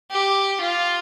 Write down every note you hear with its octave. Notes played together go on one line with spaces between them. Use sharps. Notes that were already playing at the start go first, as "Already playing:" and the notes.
G4
F4